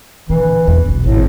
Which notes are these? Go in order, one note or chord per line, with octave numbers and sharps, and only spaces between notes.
A#2 D3 E3
A#1 E2
D#1 B1
G#1 A2